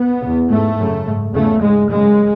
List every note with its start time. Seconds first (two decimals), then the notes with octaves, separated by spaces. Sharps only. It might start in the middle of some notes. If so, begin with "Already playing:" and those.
Already playing: B3
0.21 C#3
0.26 E2
0.49 G#2 A3
0.78 F#2 C#3
1.06 G#2
1.33 E2 C#3 A3
1.62 G#2 G#3
1.90 F#2 C#3 G#3